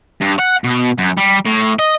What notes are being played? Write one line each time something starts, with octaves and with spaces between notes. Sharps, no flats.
G2
F#5
B2
F#2
G3
A2
D#5